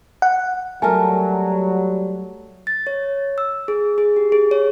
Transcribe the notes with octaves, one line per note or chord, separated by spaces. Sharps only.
F#5
F#3 G3 A3 A#4 G#5
A6
C#5
E6
G#4
G#4
G4
G#4
C#5